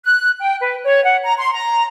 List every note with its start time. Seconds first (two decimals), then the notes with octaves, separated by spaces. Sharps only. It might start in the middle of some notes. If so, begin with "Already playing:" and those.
0.04 F#6
0.40 G5
0.60 B4
0.84 C#5
1.04 F#5
1.24 A#5
1.38 C6
1.53 A#5